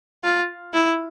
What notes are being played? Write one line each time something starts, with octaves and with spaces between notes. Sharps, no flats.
F4
E4